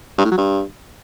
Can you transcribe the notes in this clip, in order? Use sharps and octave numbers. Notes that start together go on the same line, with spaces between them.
G2
A2
F#3
G2